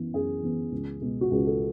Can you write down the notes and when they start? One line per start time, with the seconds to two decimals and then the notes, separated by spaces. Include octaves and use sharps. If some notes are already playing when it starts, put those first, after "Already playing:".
Already playing: F#2 E3 B3
0.14 F#2 G#4
0.43 E3 B3
0.72 C#2
1.01 B2 G#3 B3
1.21 F#4
1.31 C#2 G#4
1.45 A4